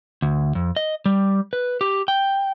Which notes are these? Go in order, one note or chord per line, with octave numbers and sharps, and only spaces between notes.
D2
F2
D#5
G3
B4
G4
G5